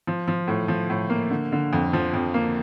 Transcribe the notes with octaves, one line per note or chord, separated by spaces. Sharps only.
F3
F3
A2
F3
A2
A#3
D3
D3
F2
F3
F2
A#3